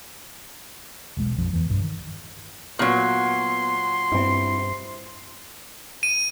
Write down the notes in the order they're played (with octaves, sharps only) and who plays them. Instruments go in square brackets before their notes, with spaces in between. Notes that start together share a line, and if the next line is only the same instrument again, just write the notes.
[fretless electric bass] E1 B1 G#3
A#1 F2 F3
E2 E3
B1 G2
D#3
[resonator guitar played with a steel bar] A#2 F#3 [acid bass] B3 [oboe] C6
[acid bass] G2 [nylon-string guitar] C4 E4
[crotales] D#7